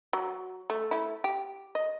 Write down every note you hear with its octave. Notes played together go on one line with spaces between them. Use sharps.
F#3
A3
A3 E4
G4
D#5